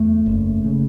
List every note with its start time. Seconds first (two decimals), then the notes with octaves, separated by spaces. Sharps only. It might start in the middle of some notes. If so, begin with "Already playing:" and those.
Already playing: E2 A3
0.26 F#1
0.65 C#3